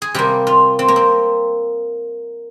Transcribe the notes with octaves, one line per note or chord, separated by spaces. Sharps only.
G#4
C3 G3 A#3 G4
F4
C4
A#3
C4